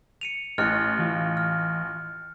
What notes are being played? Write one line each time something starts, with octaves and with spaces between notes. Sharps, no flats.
C#7 D#7 F7
A1 F6 F#6 C#7
E3 F4 F5
F6